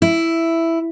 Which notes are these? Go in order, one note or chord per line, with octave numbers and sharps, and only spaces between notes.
E4